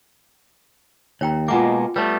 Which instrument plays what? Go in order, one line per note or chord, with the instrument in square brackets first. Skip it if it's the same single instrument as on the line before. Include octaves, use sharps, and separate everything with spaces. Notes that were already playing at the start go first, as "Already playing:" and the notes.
[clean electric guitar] D#2 [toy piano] C#5 G5 A#5
[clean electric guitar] B2 G#3 A#3 [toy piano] F4 F#5 D6
[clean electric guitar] G3 A3 B3 [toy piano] B4 C#5